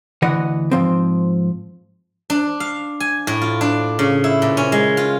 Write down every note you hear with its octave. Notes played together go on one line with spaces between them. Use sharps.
D2 E3 D#5 F#5
G#2 F3 C4
D4
F5
G#5
A2
F4
D4
C#3
E4
A#2
C#4
G#3
F4